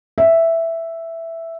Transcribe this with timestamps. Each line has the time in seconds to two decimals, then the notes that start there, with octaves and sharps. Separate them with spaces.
0.18 E5